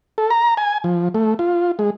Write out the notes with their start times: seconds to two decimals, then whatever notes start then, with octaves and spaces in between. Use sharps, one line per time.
0.18 A4
0.30 A#5
0.57 G#5
0.84 F3
1.15 A3
1.39 F4
1.79 G#3